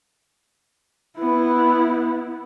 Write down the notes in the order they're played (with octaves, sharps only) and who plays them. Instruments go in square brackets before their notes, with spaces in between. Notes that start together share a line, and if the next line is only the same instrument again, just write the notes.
[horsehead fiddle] B3 E4